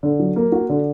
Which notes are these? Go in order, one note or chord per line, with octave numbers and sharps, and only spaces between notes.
D3
F#3
A#3
F#4
D3